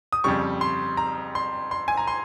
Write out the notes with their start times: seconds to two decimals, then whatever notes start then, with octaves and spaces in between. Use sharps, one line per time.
0.12 D#6
0.24 F2 C#3 G3 C#6
0.61 C6
0.97 A#5
1.35 C6
1.71 C6
1.88 G#5
1.97 A#5
2.08 C6